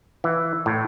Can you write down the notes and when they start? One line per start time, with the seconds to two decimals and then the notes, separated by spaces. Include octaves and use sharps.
0.24 E3
0.66 A2